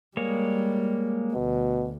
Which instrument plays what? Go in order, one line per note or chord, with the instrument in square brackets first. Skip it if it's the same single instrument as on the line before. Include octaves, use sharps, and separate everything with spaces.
[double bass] G3 [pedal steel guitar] G#3 A#3 C#5
[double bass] D2 [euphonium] B2